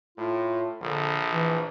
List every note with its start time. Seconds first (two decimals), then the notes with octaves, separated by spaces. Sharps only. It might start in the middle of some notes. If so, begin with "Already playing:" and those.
0.18 A2 F4
0.82 A#1 D3
1.31 E3